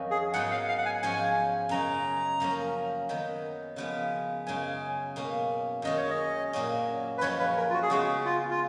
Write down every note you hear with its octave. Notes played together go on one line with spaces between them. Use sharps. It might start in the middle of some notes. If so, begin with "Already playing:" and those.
Already playing: F2 D#3 F#3 C#4
G#4
G#2 F#3 B3 D#4 F#5
F5
F5
F#5
G#5
G#2 F3 G#3 C#4 G#5
F#2 C#3 G#3 C#4 A#5
F#2 F3 A#3 C#4
D#3 F#3 B3 D#4
C#3 F3 G#3 B3
F#2 C#3 G#3 D#4 G#5
B2 A#3 C#4
F#2 D#3 G#3 C#4 D#5
C#5
D#5
A#2 F#3 A#3 C#4
B4
F#2 F3 G#3 C#4 C#5
B4
A#4
F4
F#4
G#4
C#3 G#3 B3 F#4
F4
F4